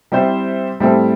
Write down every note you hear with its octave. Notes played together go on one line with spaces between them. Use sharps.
G3 C4 E4 G4 C5
A2 G3 C4 E4 A4